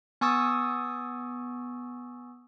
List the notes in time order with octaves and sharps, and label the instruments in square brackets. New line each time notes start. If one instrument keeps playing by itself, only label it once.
[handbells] B3 G#5 C#6 D#6 E6 A6